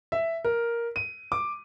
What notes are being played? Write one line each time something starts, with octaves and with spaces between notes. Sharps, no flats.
E5
A#4
D#7
D6